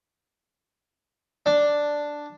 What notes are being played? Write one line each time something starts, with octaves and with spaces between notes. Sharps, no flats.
D4